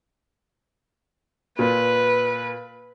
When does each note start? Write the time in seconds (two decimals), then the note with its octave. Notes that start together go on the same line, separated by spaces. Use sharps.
1.59 A#2 B4